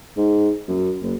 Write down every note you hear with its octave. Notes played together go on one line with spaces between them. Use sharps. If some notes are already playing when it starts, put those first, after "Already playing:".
G#2
F#2
F#1